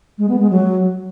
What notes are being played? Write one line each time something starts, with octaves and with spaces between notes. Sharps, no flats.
G#3
B3
G#3
F#3